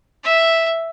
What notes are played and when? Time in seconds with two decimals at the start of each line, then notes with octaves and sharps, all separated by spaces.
0.24 E5